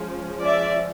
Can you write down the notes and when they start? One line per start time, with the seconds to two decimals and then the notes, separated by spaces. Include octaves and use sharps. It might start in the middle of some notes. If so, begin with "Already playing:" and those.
Already playing: F3 G#3 C#4
0.43 D5 E5